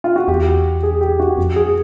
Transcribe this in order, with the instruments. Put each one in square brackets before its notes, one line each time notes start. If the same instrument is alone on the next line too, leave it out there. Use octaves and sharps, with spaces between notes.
[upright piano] F4
F#4
[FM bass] E2 [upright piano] G4
[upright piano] G#4
G4
F#4
[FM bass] F2
[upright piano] G#4